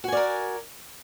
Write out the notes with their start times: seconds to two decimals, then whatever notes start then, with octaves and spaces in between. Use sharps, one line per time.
0.04 F#4
0.08 G#5
0.12 D5
0.17 A#4